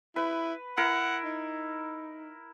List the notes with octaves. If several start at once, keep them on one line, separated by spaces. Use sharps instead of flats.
E4 B4
E4 A#4 F#5
D#4